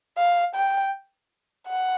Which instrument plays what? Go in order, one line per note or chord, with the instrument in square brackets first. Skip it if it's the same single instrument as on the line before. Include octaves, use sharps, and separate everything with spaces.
[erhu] F5
G5
F#5